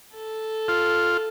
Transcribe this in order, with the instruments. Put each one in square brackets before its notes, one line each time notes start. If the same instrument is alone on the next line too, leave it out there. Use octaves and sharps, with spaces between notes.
[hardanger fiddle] A4
[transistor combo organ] F4